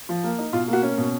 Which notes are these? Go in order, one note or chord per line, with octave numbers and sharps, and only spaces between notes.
F3
A#3
D#4
B2 F4
A#3
F#4
C#4
B2